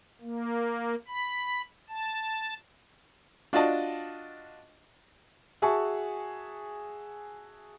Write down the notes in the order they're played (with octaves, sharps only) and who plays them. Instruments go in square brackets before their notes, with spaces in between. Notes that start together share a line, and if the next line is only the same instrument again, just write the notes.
[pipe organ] A#3
B5
A5
[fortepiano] D4 F4 F#4 D5 D#5 A5
[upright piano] F#4 G#4 E5 G#5 A5 C#6